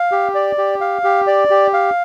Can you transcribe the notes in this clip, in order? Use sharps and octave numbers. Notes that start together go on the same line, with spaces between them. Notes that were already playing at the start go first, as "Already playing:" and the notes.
Already playing: F5
G4
D5
G4
F5
G4
D5
G4
F5